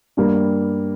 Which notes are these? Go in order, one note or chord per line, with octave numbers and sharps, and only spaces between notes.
G2 G3 A#3